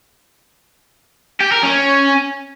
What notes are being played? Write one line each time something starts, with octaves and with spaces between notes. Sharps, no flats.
G4
A#4
C#4